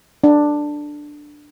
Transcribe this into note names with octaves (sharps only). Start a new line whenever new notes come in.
D4